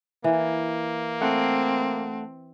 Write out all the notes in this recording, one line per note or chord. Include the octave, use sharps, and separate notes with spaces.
E3 A#3
A3 C4 F#5 A5